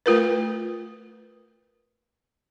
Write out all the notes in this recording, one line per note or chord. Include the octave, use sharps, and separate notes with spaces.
A3 F4 A#4 B4